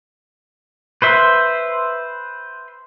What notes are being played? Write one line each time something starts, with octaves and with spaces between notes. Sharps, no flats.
B4 C5 E5